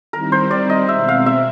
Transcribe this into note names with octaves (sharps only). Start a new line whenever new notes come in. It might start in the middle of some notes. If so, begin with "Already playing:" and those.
D#3 G3 C4 E4 A#4
C5
D5
D#5
B2 G#3 C4 E5
F5
E5